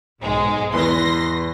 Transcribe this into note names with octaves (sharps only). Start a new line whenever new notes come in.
B1 G#2 G#3
E2 B4 C6 A#6